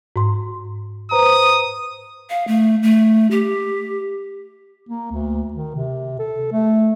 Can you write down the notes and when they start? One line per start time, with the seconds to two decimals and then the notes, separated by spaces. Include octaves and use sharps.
0.16 G#2 C6
1.11 B4 C5 A#5 D#6
2.30 F5
2.48 A3
2.83 A3
3.31 G4
4.89 A#3
5.12 D2
5.53 D#3
5.75 C3
6.19 A4
6.52 A3